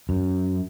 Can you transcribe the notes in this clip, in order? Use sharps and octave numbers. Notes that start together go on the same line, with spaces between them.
F#2